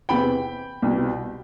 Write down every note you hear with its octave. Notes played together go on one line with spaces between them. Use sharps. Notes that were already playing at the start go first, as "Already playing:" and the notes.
E2 C3 E3 G5 B5
C2 B2